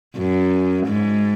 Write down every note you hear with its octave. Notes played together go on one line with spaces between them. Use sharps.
F#2
G#2